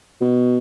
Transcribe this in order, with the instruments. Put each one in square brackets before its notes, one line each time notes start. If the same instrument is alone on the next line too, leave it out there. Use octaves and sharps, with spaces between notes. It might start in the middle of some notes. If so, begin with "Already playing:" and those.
[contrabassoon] B2